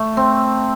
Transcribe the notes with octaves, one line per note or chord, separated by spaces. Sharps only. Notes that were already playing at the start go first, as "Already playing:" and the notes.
Already playing: A3
C4